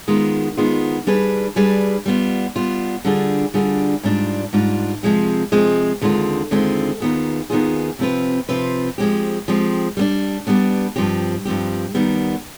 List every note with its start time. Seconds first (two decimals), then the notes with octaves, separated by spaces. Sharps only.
0.08 D#3 G#3 B3 F4
0.57 D#3 G#3 B3 F4
1.07 G3 D4 G#4 B4
1.56 G3 D4 G#4 B4
2.06 G3 B3 F4
2.56 G3 B3 F4
3.05 D3 G3 D4 F4 G#4
3.54 D3 G3 D4 F4 G#4
4.03 G#2 G3 D4 F4
4.53 G#2 G3 D4 F4
5.03 C3 F3 G#3 C4
5.52 C3 F3 G#3 C4
6.01 D#2 D3 G#3 C4 F4
6.51 D#2 D3 G#3 C4 F4
7.00 D#2 D#3 B3 F4 G#4
7.50 D#2 D#3 B3 F4 G#4
7.99 C3 F3 C4 F4 B4
8.49 C3 F3 C4 F4 B4
8.98 F3 G#3 C4 G4
9.48 F3 G#3 C4 G4
9.97 G3 B3 D4
10.47 G3 B3 D4
10.96 G2 F3 C4 G4
11.45 G2 F3 C4 G4
11.95 D#2 D#3 G3 B3